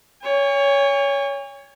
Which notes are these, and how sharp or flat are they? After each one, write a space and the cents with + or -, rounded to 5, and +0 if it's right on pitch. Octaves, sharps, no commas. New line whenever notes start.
C#5 +15 G#5 -40